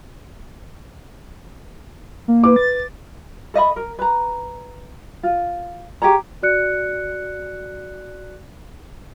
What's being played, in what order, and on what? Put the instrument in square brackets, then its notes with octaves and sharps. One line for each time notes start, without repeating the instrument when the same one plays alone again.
[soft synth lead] A#3
[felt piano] B4 D6
[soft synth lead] A6
[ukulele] A4 D#5 E5 B5
A#4
B4 A#5
F4
G4 G#4 C#5 A#5
[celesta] F#4 D5 F#6 C#7